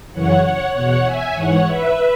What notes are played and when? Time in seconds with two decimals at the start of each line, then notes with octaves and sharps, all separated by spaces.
0.12 F#2 C#3 E3 C#5 F#5
0.42 C#5 F#5
0.73 E2 B2 C#5 F#5
1.03 E5 G#5
1.34 G#2 E3 C#5 F#5
1.65 B4 E5